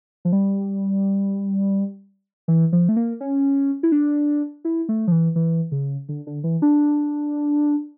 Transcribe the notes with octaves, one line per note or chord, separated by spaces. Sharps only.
F3
G3
E3
F3
A3
A#3
C#4
E4
D4
E4
A3
F3
E3
E3
C#3
D3
D3
E3
D4